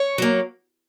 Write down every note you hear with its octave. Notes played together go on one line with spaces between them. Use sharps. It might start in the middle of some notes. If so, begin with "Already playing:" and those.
Already playing: C#5
F#3 A#3